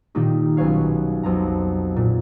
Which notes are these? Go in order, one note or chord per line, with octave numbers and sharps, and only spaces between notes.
A#2 D#3 A#3 D#4 G4
B1 C#4 B4 C#5 F5
B1 F2 A#5
A#2